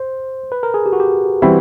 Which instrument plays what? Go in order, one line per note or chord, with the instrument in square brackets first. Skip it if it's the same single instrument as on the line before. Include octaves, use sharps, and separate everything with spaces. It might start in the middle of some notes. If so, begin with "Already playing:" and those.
Already playing: [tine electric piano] C5
B4
A#4
G#4
G4
F#4
G4
[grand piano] E3 G3 C4 E4 [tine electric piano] F#4